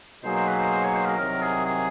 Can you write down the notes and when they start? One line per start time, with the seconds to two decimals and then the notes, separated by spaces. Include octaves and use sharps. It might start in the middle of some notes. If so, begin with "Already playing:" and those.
0.24 B2 F#3 A#3 D#4 G#4 C5
0.36 C5
0.48 B4
0.59 C5
0.70 C5
0.83 C#5
0.94 C5
1.05 A#4
1.17 C2 C3 D#3 F#3 A#4
1.42 G#4
1.65 G#4